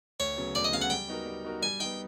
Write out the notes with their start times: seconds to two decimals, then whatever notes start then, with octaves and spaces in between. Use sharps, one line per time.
0.19 D2 C#5
0.37 C#3 F#3 B3
0.55 D2 D5
0.64 D#5
0.72 C#3 F#3 B3 F5
0.82 F#5
0.90 G3 G5
1.08 B3 D#4 F#4 A#4
1.26 G3
1.44 B3 D#4 F#4 A#4
1.62 G3 G#5
1.80 B3 D#4 G5